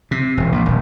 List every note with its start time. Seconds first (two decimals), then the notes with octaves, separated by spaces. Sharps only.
0.11 C3
0.37 E1
0.52 A#1
0.66 D#1